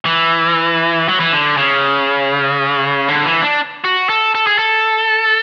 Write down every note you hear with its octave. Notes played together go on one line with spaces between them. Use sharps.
E3
F#3
E3
D3
C#3
D3
E3
D4
F#4
A4
A4
G#4
A4